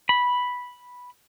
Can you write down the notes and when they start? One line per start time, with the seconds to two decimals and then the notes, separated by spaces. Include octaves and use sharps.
0.09 B5